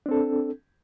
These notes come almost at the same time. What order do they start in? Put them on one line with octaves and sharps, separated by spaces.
D4 C4 A4